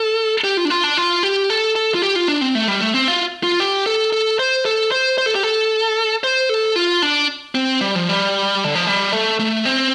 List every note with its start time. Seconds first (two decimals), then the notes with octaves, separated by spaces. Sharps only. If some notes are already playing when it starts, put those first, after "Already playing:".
Already playing: A4
0.44 G4
0.57 F4
0.65 D4
0.70 F4
0.84 D4
0.97 F4
1.23 G4
1.50 A4
1.76 A4
1.94 F4
2.02 G4
2.16 F4
2.28 D4
2.41 C4
2.55 A3
2.68 G3
2.81 A3
2.94 C4
3.08 F4
3.43 F4
3.60 G4
3.86 A4
4.13 A4
4.39 C5
4.65 A4
4.92 C5
5.18 C5
5.26 A4
5.35 G4
5.43 A4
6.24 C5
6.49 A4
6.76 F4
7.02 D4
7.55 C4
7.81 G3
7.95 F3
8.09 G3
8.64 D3
8.75 F3
8.87 G3
9.13 A3
9.39 A3
9.65 C4